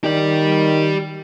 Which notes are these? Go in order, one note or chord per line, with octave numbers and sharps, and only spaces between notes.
D#3 G4 D5